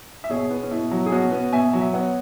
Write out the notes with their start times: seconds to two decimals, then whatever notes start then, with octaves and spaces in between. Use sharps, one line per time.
0.24 E5
0.29 B2 G#4 C#5
0.50 B3
0.63 C#4
0.71 B2 E4
0.91 F#3
1.06 G#4
1.12 B2 C#4 F#4
1.32 B3
1.53 B2 E5 G#5
1.73 F#3
1.81 E5
1.93 B3 C#5 F#5